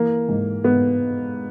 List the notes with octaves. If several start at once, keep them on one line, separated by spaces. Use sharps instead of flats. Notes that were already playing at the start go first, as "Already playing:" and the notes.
Already playing: E3 A#3
G#2
G#2 B3